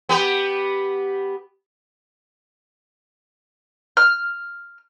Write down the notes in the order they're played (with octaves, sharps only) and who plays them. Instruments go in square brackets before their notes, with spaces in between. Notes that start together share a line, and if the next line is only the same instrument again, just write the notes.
[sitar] B3 G4 B4
[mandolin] F6